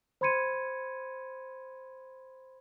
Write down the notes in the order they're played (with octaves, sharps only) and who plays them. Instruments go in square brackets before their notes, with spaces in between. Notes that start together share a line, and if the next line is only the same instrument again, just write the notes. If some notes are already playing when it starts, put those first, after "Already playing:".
[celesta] C5 B5 C6 G#6 C#7 D#7